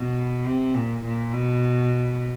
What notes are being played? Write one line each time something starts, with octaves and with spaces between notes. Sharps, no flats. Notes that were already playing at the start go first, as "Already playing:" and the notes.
Already playing: B2
C3
A#2
A#2
B2